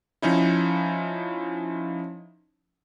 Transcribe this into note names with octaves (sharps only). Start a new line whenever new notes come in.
F3 C#4 D#4 E4